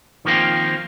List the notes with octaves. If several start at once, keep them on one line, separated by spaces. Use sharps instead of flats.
D#3 F3 A#3 C4 F4